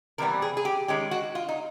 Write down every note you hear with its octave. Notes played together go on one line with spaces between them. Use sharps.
C3 E3 G3 B3 A#4
G#4
G#4
G4
D#3 G#3 C#4 G4
F#4
F4
D#4